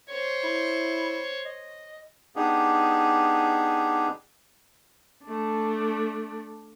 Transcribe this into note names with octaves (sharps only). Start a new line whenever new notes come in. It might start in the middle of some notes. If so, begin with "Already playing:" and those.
C5 C#5
E4
D#5
B3 D4 D#4 G4 G#4
A3 D4